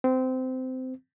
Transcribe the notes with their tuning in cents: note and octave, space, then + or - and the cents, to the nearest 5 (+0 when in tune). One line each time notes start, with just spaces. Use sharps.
C4 -20